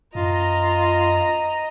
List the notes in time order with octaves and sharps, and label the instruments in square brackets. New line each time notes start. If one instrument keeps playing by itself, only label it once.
[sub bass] F#2 [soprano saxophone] F4 [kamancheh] D#5 A#5